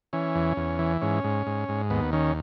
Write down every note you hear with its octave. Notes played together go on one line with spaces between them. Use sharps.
E3 C#4
E2
E2
E3
G#2 C#4
G#2
G#2
G#2
D#2 B3
D#3 C#4